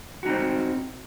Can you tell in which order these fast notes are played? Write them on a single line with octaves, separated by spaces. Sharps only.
F#4 D#4 C4